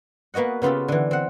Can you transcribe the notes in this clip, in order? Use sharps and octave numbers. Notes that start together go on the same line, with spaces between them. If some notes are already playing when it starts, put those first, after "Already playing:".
A#3 B3 F#4 D#5 F#5
C#3 B3 F4 G4 A4
D3 E3
C4 F#5